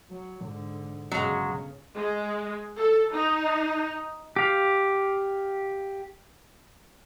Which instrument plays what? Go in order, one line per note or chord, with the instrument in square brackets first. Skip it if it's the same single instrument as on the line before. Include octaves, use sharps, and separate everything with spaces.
[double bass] F#3
G#2 D3
[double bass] G1 C#3 [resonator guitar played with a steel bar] F#3 G#3
[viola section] G#3
A4
D#4
[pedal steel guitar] G4 F5